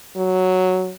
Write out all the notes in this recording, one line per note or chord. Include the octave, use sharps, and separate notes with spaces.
F#3